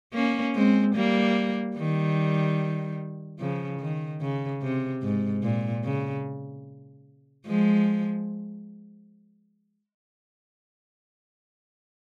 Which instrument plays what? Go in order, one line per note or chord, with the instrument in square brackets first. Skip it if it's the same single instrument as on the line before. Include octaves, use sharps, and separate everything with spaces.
[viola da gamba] A#3 C#4
G#3 C4
G3 A#3
D#3 G3
C#3 F3
D#3
C#3
C3
G#2
A#2
C#3
F3 G#3